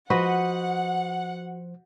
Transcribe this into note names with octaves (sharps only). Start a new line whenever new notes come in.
F3 F#4 B4 C5 D#5 F#5